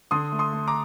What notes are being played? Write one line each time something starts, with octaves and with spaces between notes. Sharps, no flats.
D3 C6 D#6
A3
C6 D#6
A3
A#5 D6